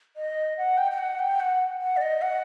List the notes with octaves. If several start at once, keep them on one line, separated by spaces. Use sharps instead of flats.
D#5
F#5
G5
G5
F#5
G5
F#5
F#5
D5
D#5
F#5